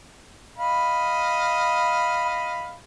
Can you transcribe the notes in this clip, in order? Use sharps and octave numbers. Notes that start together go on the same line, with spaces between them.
D#5 F5 B5